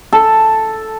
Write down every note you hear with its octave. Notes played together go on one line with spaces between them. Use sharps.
A4